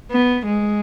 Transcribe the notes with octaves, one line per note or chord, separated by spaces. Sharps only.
B3
G#3